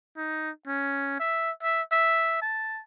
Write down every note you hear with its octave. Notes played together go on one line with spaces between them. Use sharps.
D#4
C#4
E5
E5
E5
A5